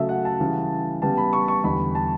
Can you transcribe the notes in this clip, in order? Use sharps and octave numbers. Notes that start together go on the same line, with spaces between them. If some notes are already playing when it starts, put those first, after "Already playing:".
Already playing: C#3 F#3 A3 A4 E5
F#5
A5
C#3 E3 G3
C#3 G3 B3 A5
B5
C#6
C#6
E2 D3 G3 B5
A5